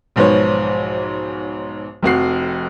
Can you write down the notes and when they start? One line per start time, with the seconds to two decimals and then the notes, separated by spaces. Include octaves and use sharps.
0.16 B1 G#2 F3 B4 C#5
2.03 F1 F2 F#4 C7